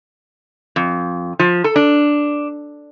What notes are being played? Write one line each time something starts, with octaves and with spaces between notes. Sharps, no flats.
F2
F3
A4
D4